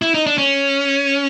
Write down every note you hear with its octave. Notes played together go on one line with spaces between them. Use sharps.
E4
D#4
D4
C#4